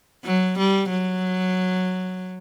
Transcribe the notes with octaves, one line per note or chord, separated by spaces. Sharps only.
F#3
G3
F#3